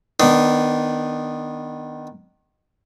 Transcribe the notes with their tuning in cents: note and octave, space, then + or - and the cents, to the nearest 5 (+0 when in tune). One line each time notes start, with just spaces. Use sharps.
D#3 -15 B3 +0 D4 +0